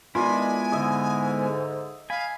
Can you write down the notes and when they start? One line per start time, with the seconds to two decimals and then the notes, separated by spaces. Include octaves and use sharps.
0.15 D#3 G#3 B3 D4 E4 F4 G#5 B5
0.72 G#2 D3 D#5 E5 D#6
2.10 F5 G#5 B5